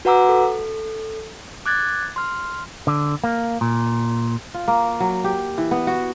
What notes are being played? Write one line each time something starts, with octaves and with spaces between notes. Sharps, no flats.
F#4 B4 F#5 A#5 D6 E6
A4
D6 F#6 G#6 A6
C6 F6
D3
A#3
A#2
F4
A#3
F#3
G4
E3
B3
F#4